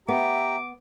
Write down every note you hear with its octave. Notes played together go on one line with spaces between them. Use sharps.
B3 G4 E5 A#5 D6